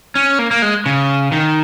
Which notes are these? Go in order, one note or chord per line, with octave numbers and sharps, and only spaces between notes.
C#4
A#3
A#3
G#3
C#3
D#3